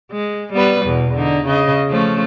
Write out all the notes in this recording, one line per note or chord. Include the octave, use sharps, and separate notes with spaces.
G#3
G3 B3 B4
E2 B2
D3 D#4
C#3 D#5
F3 A3 C#4